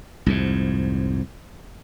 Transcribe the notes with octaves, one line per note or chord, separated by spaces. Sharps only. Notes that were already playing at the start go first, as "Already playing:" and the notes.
C2 F2 G#2